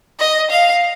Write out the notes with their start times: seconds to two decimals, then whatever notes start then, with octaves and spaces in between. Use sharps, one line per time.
0.19 D#5
0.50 F5